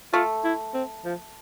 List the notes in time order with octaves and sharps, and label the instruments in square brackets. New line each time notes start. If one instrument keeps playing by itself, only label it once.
[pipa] A3 [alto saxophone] F4
[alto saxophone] E4
C4
F3